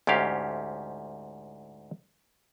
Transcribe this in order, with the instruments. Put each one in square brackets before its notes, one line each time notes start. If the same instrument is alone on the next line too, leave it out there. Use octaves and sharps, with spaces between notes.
[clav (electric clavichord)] D2 G#2 C#4 G4 F5